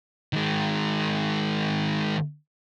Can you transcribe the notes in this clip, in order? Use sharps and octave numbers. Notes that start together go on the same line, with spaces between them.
D#3 G#3